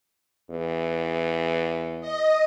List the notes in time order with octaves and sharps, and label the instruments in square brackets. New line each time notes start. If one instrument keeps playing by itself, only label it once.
[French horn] E2
[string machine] D#5